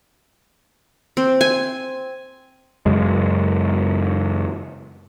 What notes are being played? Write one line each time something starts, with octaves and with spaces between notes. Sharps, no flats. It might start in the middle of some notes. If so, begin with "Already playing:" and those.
C4
G#5
F#2 C#3 G#3